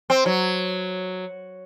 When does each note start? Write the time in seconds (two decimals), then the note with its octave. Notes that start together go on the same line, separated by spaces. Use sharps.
0.10 C4
0.26 F#3